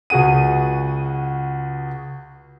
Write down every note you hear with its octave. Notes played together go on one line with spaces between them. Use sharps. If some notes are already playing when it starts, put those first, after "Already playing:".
C#2 F#4 G#4 F#5 D#7